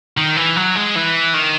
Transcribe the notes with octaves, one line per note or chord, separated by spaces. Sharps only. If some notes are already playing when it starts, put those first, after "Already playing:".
D#3
E3
F#3
G#3
E3
D#3